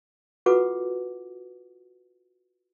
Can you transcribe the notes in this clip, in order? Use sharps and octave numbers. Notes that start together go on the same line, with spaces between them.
F4 F#4 A4 B4 F#5 D6